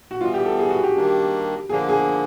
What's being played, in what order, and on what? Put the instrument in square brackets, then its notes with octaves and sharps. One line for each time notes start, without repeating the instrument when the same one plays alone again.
[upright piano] F#4
[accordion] E3 G3 B3 [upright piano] F4
[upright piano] G4
A4
G#4
F#4
G4
[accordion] D#3 G3 A#3 D4
[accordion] D3 F3 A#3 D4 [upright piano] G#4
[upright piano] G#4